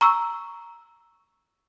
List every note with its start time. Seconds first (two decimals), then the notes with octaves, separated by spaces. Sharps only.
0.01 A#5 C#6 E6